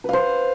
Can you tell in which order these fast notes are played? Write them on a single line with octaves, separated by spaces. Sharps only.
B4 F5 C5